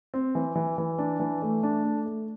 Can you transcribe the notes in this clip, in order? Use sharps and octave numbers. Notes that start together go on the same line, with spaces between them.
C4
E3
E3
E3
D4
E3
A3
D4
A3
A3